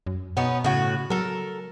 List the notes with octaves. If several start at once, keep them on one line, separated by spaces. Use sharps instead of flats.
F#2
B2 B3 C#4 D#4
A2 C#3 F#4
F#3 A4 A#4